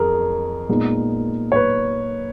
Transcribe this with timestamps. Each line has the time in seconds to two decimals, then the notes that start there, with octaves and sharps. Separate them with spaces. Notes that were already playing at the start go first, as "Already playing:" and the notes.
Already playing: F2 G#4 A#4
0.69 A#2 G#3 B3 D#4
1.52 C#5
1.56 B4